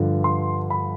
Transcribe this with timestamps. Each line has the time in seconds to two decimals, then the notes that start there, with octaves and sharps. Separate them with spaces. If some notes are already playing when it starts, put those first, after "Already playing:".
Already playing: G2 D3 F3
0.24 C6
0.70 B5